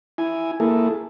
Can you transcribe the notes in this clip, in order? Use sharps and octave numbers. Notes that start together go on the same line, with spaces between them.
E4 G#5
A#3 E4 G#4 A4